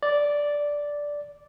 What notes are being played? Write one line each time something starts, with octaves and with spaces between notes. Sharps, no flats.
D5